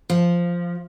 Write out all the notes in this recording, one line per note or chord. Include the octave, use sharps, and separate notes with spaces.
F3